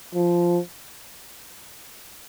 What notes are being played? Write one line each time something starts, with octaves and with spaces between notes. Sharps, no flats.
F3